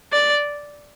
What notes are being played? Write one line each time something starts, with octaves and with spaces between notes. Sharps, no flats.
D5